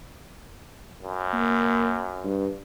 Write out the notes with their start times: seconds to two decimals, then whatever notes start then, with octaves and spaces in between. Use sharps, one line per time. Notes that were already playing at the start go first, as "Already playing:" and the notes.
1.02 F#2
1.33 A#3
2.24 G2